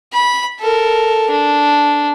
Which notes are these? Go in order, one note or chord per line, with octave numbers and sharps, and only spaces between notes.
B5
A4 A#4
D4